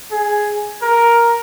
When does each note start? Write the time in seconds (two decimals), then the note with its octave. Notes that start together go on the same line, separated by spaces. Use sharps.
0.12 G#4
0.82 A#4